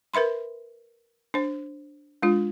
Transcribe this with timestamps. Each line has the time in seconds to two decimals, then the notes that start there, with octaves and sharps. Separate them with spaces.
0.14 A#4 B4 E5 B5 C6
1.34 D4 C5
2.22 G#3 D4 F4